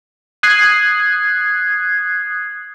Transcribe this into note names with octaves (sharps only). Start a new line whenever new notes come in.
D#6 F#6 G#6 C7